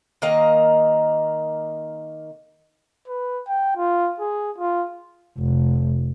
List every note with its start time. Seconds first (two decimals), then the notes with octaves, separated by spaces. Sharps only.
0.22 D#3 A#3 D#5
3.08 B4
3.48 G5
3.77 F4
4.20 G#4
4.58 F4
5.37 F1